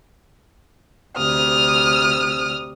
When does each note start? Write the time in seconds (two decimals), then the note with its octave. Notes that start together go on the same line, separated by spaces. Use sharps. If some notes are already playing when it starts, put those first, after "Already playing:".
1.17 D2 C3 D#6 F6